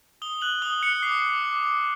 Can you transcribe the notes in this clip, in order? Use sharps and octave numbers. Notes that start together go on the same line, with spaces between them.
D#6 G7
F#6 F#7
D#6 G7
F#6 C#7
D6 C7
D6
D6
D6